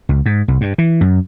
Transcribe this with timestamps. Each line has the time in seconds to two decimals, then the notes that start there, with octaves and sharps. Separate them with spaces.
0.09 C#2
0.26 G#2
0.48 C2
0.61 G2
0.78 E3
1.01 F#2